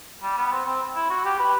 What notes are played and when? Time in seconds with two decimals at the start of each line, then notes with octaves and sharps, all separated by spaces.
0.23 G3
0.37 B3
0.51 C4
0.66 C4
0.95 E4
1.10 F#4
1.25 G4
1.39 B4